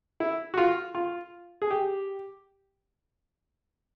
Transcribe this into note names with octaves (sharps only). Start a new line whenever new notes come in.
E4
F#4
F4
F4
G#4
G4